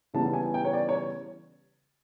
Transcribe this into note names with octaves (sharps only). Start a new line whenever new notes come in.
C#3 E3 G3 B3 A5
G#5
G5
C#5
D5
C#5